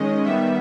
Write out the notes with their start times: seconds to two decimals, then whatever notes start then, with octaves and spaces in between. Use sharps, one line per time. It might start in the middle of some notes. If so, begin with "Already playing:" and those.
Already playing: D#3 G#3 C#4 D#5
0.24 D#3 G3 B3 E5